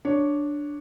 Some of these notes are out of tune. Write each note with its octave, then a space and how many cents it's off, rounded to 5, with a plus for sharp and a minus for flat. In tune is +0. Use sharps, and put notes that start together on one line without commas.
D4 +0 C#5 +5